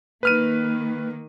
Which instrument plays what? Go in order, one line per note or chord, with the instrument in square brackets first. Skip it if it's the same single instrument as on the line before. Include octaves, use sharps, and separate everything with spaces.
[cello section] D#3 A#3 [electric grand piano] B4 F6 D#7